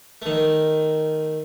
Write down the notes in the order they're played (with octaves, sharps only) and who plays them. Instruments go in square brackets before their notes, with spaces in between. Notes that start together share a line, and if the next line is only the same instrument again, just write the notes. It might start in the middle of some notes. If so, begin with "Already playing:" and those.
[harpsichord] D#3 A3